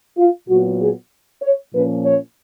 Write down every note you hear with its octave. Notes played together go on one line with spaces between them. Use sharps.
F4
A#2 F#3 B3 F#4
G#4
C#5
A#2 F3 A#3 C#4 B4
C#5